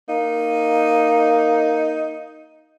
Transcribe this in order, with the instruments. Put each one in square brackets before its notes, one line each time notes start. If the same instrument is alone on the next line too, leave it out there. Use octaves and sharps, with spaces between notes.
[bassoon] A#3 [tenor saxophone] D#4